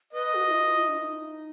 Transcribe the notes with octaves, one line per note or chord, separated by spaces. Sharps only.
B4 D#5
F#4
E4
F4
E4
D4
D#4